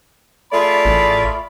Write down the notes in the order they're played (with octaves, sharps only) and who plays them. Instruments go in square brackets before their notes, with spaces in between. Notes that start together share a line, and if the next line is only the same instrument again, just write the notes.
[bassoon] A3 [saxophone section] F4 G#4 D5 [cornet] B5
[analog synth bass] A1